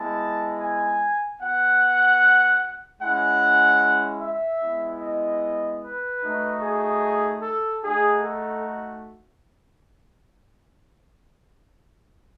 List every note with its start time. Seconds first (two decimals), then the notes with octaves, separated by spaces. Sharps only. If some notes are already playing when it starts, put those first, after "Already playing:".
Already playing: G#3 B3 E4 A5
0.61 G#5
1.41 B3 F#4 F#5
3.01 G#3 C#4 E4 F#5
4.22 E5
4.62 G#3 B3 E4
5.02 D#5
5.82 B4
6.22 A3 D#4 F#4
6.62 G#4
7.42 A4
7.82 A3 D#4 F#4 G#4
8.23 A4